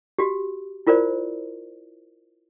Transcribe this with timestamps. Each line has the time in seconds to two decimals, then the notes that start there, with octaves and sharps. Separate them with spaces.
0.19 F#4 G4
0.87 E4 F4 A#4 C5 D5